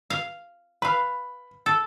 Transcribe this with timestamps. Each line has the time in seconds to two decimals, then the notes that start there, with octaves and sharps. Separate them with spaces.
0.10 F5
0.82 B4 F5 B5
1.66 A4